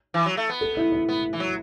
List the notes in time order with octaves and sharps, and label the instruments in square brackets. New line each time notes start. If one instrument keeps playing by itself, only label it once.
[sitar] E3
F#3
A3
B3
[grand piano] A4
E4
E4
[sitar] B3
E3
F#3